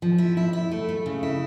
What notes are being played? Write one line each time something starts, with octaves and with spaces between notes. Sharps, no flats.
F3
E4
E4
E4
A3
A3
C#3
E4